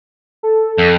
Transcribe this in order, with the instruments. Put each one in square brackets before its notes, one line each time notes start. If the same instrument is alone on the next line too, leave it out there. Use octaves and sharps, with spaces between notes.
[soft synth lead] A4
[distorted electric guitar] F2